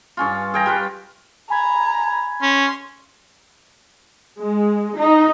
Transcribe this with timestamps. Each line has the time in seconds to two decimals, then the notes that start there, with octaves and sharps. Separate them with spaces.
0.17 G2 C#4 F4
0.54 G#4 G5 A#5
0.66 G3 F4 B4
1.50 G#5 A#5 B5 G#6
2.42 C#4 C6
4.39 G#3
4.98 D#4